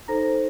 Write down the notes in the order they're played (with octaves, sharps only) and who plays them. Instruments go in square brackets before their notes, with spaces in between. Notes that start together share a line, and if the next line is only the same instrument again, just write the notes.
[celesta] D#4 A4 C5 A#5 A#6